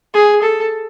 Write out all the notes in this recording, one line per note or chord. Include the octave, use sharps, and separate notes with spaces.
G#4
A4